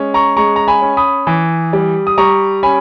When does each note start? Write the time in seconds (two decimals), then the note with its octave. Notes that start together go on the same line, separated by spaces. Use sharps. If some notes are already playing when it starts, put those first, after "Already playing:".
Already playing: G#3 C#4
0.14 A#5 C#6
0.37 G#3 A#5 C#6
0.56 A#5
0.68 G#5 B5
0.82 C#4
0.97 B5 D#6
1.27 E3
1.73 G3
2.07 D#6
2.18 G3 A#5 C#6
2.63 C#4 G#5 B5